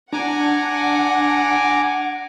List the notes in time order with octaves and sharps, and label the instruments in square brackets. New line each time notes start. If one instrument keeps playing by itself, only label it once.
[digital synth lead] D4 [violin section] F#5 [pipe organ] G#5 A#5 D6